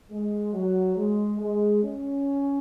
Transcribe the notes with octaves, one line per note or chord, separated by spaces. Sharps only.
G#3
F#3
G#3
G#3
C#4